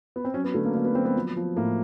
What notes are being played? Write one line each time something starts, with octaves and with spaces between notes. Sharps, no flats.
B3
C4
F#3 C#4
B3
D3 A3
A#3
D3 A#3
B3
F#3 C4
B3
F3
F3
A2 A#3